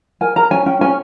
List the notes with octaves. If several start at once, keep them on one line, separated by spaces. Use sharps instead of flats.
A#4 G#5
A#4 A#5
C#4 G#5
C#4 G5
C#4 G#5